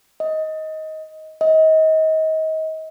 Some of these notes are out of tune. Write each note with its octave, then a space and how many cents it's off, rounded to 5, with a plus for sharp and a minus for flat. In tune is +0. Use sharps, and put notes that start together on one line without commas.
D#5 +15
D#5 +30